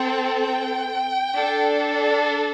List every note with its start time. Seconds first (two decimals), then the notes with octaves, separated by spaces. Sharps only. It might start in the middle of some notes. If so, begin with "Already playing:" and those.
Already playing: C4 A4 G5
0.40 G5
1.33 D4 A4